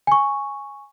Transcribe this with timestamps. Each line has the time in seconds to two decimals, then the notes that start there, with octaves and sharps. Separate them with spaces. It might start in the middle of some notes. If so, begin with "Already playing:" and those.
0.07 G#5 C#6